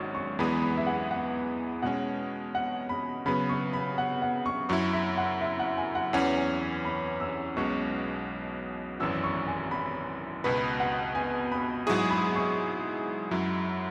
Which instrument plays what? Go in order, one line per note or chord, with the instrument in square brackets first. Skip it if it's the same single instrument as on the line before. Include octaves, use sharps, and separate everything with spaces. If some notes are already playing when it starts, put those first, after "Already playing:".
Already playing: [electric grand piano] G#1 G#2 F#3 C#4 [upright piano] C#6
[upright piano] C#6
[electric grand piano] E2 E3 G#3 B3 G#4 [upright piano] B5
[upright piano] B5
E5
F#5
F#5
[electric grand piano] B2 G#3 C#4 [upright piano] F#5
[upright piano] F#5
B5
[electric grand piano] C#3 F#3 B3 [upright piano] B5
[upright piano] C#6
B5
F#5
F#5
C#6
[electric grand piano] F#2 F#3 E4 [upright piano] C#6
[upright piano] E5
F#5
E5
F#5
G#5
F#5
[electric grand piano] E2 E3 C#4 [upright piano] F#5
[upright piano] G#5
B5
E6
[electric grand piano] B1 B2 G#3 C#4 F#4 [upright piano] C#6
[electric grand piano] G#1 F#2 E3 C#4 F#4 [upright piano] E6
[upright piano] C#6
G#5
B5
[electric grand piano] C#2 B2 B3 F#4 B4 [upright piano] B5
[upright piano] F#5
G#5
B5
[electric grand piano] G#2 F#3 E4 G#4 [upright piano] C#6
[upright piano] B5
C#6
[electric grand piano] F#2 F#3 E4